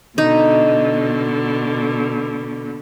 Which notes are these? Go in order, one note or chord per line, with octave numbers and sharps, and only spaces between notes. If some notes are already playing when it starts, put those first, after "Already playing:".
B2 D3 D#4